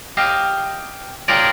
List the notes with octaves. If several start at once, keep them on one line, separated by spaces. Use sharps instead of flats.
G4 D#5 F5
F4 G4 G#4 A#4 C#5 D5